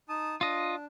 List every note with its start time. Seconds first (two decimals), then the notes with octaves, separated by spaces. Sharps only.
0.09 D#4 A5 D#6
0.41 D4 F4 D#5